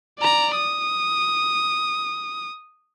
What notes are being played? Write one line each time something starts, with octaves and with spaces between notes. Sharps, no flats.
D5 A#5
D#6